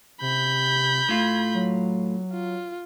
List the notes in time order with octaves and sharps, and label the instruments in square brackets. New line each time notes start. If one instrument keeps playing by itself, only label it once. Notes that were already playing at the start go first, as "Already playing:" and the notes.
[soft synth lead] C3 [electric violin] B5 G6
[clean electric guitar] A2 F4 [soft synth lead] G#6
[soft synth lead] F#3
[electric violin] F4